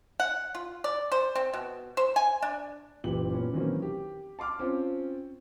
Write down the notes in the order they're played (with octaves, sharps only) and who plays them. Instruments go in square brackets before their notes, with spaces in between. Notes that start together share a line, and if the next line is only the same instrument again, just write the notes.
[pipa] F#5
F4
D5
C5
C4
B2
C5
G#5
D4
[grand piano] F#1 A#2 E3 G4 F#7
A#2 B3 C#4
D#3 E3 F#3 A#3 C4 C#4
G4
A5 C6 D6 F6
C4 C#4 F4